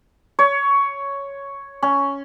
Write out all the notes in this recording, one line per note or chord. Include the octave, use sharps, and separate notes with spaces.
C#5
C#4